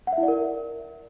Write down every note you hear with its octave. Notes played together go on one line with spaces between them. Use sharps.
F#5
E5
E4
D5
A#4